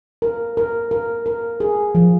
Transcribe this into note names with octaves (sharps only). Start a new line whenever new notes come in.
A#4
A#4
A#4
A#4
G#4
F3